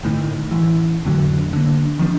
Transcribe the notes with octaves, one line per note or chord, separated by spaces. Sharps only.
G1 A2 D#3
A1 E3
F2 A2 D3 F#3
D3 A#3
D#3 F3 D4